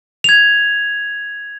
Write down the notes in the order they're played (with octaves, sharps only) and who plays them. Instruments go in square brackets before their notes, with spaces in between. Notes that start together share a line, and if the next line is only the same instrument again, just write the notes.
[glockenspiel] G#6 F7